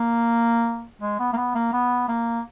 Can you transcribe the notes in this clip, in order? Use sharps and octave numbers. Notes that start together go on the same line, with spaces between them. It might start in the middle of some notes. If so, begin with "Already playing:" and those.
Already playing: A#3
G#3
B3
A#3
B3
A#3
B3
A#3